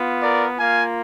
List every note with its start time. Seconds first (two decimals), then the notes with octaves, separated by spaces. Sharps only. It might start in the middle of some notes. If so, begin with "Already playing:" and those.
Already playing: B3 F4
0.23 A#4 D5
0.57 A#3 F4 F5 G#5